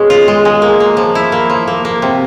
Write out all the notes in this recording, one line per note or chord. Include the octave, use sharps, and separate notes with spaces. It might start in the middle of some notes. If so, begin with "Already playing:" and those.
Already playing: B2 G#3 C#4
F4
G#3
G#3
A#3
A#3
F3
E4
A#3
F3
A#3
A#3
C3